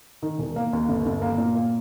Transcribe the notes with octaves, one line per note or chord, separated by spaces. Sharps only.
D#3
E1
A#3
D#2
G1
G1
A#3
A#2
A#3